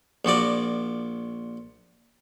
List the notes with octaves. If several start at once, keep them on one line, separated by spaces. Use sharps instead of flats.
A#1 F3 F#4 D5